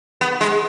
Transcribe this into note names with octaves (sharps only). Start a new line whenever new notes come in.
B3
G#3